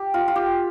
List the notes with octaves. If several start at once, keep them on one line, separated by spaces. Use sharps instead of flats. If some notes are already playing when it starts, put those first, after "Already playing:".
Already playing: G4
F4
F4
G4